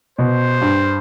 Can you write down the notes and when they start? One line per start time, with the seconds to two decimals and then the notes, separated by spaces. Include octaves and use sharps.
0.19 B2 C5
0.61 G2